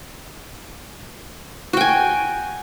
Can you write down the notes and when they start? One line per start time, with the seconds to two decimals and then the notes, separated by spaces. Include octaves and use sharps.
1.73 F#4
1.77 G5
1.81 G#5